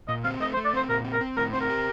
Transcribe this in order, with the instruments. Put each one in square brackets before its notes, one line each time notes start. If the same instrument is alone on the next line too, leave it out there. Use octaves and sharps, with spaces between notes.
[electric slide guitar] A#2 [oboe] D#5
[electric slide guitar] C4 [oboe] F5
[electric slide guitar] A3 [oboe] D#5
[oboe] C5
[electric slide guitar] A3
[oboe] D5
[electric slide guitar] C4 [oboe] C5
[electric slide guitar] A#2 [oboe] A#4
[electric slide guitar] C4
[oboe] A#4
[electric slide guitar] C4
[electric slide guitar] A2 [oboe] A#4
[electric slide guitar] C4 [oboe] C5
[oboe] A#4
[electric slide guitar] G4